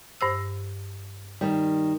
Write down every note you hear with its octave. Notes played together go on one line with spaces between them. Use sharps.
G2 C5 E6
D#3 G3